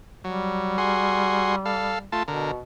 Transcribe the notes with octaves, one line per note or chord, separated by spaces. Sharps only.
F#3 G3
F#4 G#4 C6
A4 F5
A3 F4 A5
B2 D3 A#4